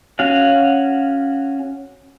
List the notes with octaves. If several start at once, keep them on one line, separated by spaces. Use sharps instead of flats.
C#4 F#4 F5 F#5